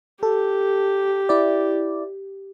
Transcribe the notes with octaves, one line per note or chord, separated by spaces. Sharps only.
G4 A4
E4 D5